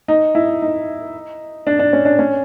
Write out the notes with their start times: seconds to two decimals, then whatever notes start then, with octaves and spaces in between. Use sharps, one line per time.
0.08 D#4
0.35 E4
0.62 D#4
1.67 D4
1.79 D4
1.93 C#4
2.05 D4
2.19 C#4